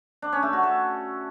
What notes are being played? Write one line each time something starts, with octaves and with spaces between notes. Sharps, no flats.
D4
C#4
A3
F#4
A4